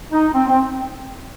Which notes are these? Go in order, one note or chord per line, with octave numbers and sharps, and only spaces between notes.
D#4
C4
C4